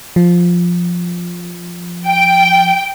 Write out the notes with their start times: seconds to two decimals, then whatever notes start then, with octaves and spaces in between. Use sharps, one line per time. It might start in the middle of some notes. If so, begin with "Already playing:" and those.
0.16 F3
2.05 G5